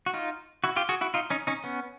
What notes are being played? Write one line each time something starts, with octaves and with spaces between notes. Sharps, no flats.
F#4
D#4 F4
E4 F#4
F4 G4
F#4 G#4
E4 F#4
D#4 F4
C#4 D#4
C#4 D#4
B3 C#4